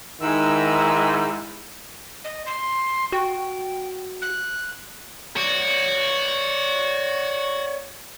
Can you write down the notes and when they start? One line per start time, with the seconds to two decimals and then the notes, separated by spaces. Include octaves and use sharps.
0.21 G#2 D#3 G#3 E4 E6
2.24 D#5
2.46 C6
3.12 F#4 G5
4.22 F#6
5.36 F#4 C#5 D5